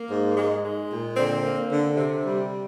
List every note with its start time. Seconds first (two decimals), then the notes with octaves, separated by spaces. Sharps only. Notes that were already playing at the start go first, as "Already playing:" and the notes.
Already playing: A#3
0.09 G#2
0.36 G#3
0.63 G#3
0.90 A#2
1.16 D3 C4
1.44 A#3
1.70 D3
1.97 C3
2.25 G3